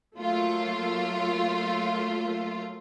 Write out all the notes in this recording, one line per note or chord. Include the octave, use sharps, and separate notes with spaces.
F#3 A3 A#3 F4